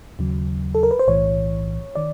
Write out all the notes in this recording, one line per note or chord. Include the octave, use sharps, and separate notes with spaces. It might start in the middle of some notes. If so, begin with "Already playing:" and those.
D#2 C#3 F#3
A4
A#4
B4
C5
B1 A2 E3 C#5
D#3 D5